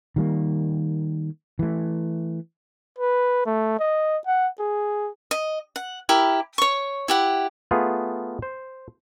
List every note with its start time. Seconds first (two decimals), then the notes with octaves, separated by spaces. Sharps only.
0.16 D#3 G3 A#3
1.59 E3 A3
2.99 B4
3.46 A3
3.79 D#5
4.27 F#5
4.60 G#4
5.31 D#5
5.76 F#5
6.09 E4 G4 A#4
6.58 C#5 C#6
7.08 E4 G4 F#5
7.71 A3 B3 F4 G#4
8.42 C5